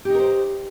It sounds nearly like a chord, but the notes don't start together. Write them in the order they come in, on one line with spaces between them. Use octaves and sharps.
G4 D#4 A#4 C5